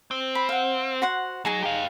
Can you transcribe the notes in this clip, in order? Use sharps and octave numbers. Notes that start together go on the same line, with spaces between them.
C4
B5
F5 F#5
F#4 C5 F#5
F#3 D#4 G#4 A#5
G4 F5